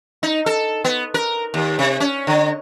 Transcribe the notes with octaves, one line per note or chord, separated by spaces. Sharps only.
D#4
A4
B3
A#4
D#2
C3
C#4
D3